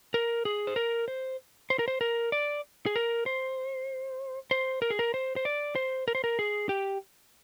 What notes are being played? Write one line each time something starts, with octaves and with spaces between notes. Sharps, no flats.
A#4
G#4
C5
A#4
C5
C5
A#4
C5
A#4
D5
G#4
A#4
C5
C5
A#4
G#4
A#4
C5
C5
D5
C5
A#4
C5
A#4
G#4
G4